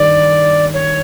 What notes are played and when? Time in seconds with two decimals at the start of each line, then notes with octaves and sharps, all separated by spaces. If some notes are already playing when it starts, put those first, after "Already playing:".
Already playing: G2 D#3 D5
0.74 C#5